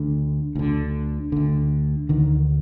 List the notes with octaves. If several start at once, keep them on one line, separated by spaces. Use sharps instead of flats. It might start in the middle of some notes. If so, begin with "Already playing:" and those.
Already playing: D2 D3
D2 D3
D2 D3
D2 D3 D#3